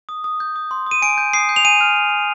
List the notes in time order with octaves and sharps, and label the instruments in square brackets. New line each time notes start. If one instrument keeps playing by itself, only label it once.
[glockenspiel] D#6
D#6
G6
D#6
C6
D#6 D#7
G#5 D7
G6
D#6 C7
G6
F7
G#5 D#7
F6